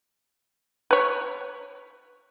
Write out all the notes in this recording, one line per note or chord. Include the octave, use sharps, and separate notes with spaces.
B4 C#5